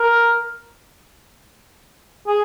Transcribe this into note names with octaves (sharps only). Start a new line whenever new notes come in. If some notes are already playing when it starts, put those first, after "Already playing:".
Already playing: A#4
G#4